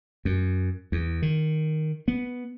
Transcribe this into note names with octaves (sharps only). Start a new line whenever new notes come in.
F#2
E2
D#3
B3